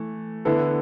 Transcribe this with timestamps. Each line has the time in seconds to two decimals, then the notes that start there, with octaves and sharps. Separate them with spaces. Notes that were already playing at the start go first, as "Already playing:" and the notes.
Already playing: E3 A3
0.45 D3 B3 E4 A4